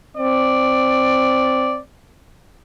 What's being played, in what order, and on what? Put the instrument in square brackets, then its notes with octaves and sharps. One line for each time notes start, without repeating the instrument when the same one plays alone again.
[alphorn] C4 [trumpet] D5